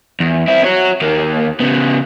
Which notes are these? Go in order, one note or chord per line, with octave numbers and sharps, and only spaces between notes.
E2
C4 E4
F#4 C#5
D#2 A#3
C#3 B3